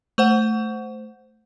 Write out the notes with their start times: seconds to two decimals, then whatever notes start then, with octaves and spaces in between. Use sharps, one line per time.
0.18 A3 C5 F#5